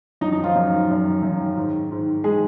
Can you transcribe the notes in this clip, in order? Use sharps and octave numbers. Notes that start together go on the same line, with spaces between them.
F#2 D#3 D#4
D#4
F3 F4
F#2 D#3
F#2 D#3
F#2 D#3
G#2 D#3
G#2 D#3
D#3 G#3 G#4